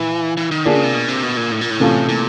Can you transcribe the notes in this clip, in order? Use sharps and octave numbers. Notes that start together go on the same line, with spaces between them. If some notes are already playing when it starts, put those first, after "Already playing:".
Already playing: A#2 E3
E3
D#3
D3 A#3 D4 F4 G#4
C#3
C3
B2
C3
B2
A#2
A2
A#2
A2
C3 E3 A3 C#4 F4
A#2